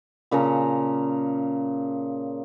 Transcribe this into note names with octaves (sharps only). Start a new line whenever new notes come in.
A#2 C#3 A5 A#5